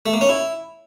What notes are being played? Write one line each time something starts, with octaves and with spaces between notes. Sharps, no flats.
A3
A#3
C#4
E4